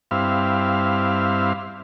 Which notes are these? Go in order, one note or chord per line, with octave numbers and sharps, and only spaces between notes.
G2 C4 E4 F5